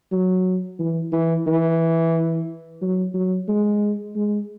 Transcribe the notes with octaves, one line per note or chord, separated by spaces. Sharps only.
F#3
E3
E3
E3
F#3
F#3
G#3
G#3